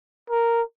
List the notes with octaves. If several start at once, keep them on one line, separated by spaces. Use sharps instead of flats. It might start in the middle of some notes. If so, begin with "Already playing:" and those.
A#4